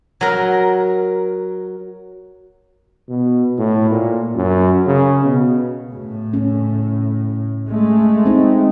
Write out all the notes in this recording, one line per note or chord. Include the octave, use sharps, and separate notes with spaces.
F#3 A#4
B2
A2
A#2
F#2
C#3
B2
A2
C#4
G#3 A3
C4 D#4